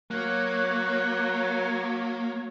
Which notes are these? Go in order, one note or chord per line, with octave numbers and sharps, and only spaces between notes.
F#3 A#3 C#5 F#6